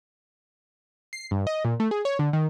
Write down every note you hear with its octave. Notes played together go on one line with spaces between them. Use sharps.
C7
G2
D#5
A#2
A3
G#4
C#5
D3
D#3